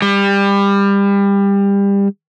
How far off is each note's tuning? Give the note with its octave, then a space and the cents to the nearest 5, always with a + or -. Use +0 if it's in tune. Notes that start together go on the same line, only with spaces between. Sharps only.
G3 +25